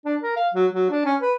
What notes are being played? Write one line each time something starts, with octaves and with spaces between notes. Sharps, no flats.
D4
A#4
F5
F#3
F#3
D4
C#4
B4